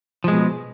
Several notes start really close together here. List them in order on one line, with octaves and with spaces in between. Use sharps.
F3 G#3 B2